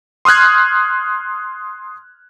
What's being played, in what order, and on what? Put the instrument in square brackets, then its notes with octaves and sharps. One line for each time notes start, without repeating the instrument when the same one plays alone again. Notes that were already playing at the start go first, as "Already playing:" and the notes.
[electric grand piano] C6 D#6 F6 F#6 G#6